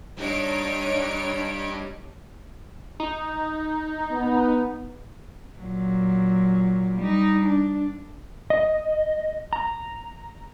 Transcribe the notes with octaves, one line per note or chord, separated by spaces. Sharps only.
G3 D4 D#4 C#5 D7
D#4
B3
A#2 F#3
G3 D#4
D4
D#5
A#5